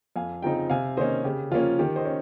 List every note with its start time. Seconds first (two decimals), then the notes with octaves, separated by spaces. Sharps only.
0.16 F2 F5 G#5
0.42 C#3 F3 C4 D#4 G5 A#5
0.70 C3 F5 G#5
0.97 D#3 A#3 C#4 C5 D#5
1.24 C#3 G4
1.51 F3 A#3 C#4 F4
1.79 D#3 G4
1.96 C5 D#5
2.05 C#4